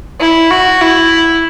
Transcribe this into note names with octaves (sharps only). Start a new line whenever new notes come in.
E4
F#4
E4